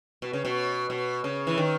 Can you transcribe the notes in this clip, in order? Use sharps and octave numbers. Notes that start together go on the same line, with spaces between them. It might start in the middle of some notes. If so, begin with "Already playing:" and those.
B2
C#3
B2
B2
C#3
E3
D#3